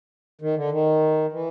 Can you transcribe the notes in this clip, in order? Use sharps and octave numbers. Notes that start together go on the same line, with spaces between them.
D#3
D3
D#3
E3